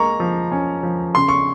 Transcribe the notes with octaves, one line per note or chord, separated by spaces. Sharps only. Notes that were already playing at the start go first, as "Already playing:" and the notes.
Already playing: G#3 A#3 A#5 C#6
F3
C#4
F3
C#3 C6
C#6